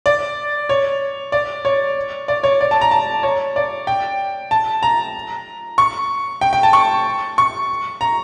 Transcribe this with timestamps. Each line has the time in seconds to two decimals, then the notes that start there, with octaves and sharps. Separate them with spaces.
0.06 D5
0.69 C#5
1.32 D5
1.65 C#5
2.28 D5
2.44 C#5
2.61 D5
2.71 A5
2.81 A#5
2.91 A5
3.23 C#5
3.56 D5
3.87 G5
4.51 A5
4.83 A#5
5.78 C#6
6.41 G5
6.53 G5
6.63 A5
6.73 C#6
7.38 C#6
8.01 A#5